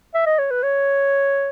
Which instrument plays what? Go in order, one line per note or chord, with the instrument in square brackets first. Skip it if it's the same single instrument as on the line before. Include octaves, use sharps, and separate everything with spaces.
[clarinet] E5
D#5
C#5
B4
C#5